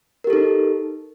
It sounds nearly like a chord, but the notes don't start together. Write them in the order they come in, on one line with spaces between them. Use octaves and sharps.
A#4 G4 A4 D#4